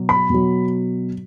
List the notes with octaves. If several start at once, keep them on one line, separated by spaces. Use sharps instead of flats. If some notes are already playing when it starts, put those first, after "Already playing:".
Already playing: B2 F#3
B5
B2 F#3